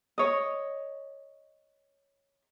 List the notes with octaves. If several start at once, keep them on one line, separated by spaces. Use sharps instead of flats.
C#5 D#5